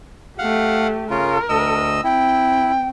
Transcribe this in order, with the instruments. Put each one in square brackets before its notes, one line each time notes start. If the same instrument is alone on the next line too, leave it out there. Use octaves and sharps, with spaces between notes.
[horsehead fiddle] A3 G4 [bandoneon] F5 F#5
[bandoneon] C#3 F4 [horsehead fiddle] A#4
[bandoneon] D2 D#5 E6
[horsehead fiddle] C4 [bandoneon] E4 [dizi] G5